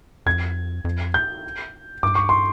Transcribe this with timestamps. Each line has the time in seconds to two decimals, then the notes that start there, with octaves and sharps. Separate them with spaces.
0.26 F2 G#6
0.85 F2
1.14 G6
2.03 G2 D6
2.15 C#6
2.29 C6